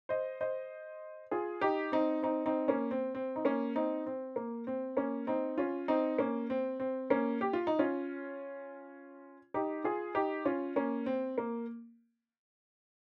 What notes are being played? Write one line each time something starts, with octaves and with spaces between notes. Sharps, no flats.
C5 D#5
C5 D#5
F4 G#4
D#4 G4
C4 D#4
C4 D#4
C4 D#4
A#3 C#4
C4
C4
D#4
A#3 C#4
C4 D#4
C4
A#3
C4
A#3 C#4
C4 D#4
C#4 F4
C4 D#4
A#3 C#4
C4
C4
A#3 C#4
G4
F4
D#4
C#4 F4
D#4 G4
F4 G#4
D#4 G4
C#4 F4
A#3 C#4
C4
A#3